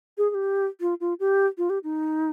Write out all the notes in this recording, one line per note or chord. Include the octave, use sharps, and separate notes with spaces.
G#4
G#4
G4
F4
F4
G4
F4
G4
D#4